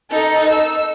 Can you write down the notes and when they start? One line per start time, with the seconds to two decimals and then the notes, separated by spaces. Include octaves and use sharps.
0.11 D#4 A4
0.50 E6